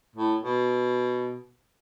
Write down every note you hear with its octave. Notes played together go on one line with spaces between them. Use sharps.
A2
B2